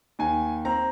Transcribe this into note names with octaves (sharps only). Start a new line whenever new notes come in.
D#2 G#5
C4 A#5